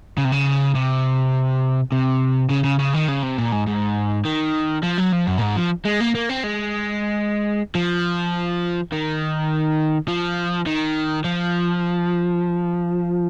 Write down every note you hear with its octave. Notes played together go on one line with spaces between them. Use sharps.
C#3
C3
C#3
C3
C3
C#3
C#3
C#3
D#3
C#3
C3
A#2
G#2
G#2
D#3
F3
F#3
F3
F#2
A#2
G#2
F3
G#3
A#3
A#3
C4
G#3
F3
D#3
F3
D#3
F3